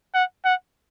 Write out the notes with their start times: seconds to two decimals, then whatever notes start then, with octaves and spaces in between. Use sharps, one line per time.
0.14 F#5
0.45 F#5